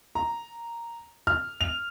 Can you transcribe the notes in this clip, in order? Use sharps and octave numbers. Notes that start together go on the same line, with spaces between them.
A#5
F6
F7